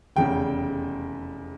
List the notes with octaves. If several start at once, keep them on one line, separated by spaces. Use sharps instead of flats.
F1 E2 C#3 G5